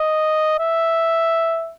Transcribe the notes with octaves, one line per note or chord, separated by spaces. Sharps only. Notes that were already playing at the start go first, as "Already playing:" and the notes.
Already playing: D#5
E5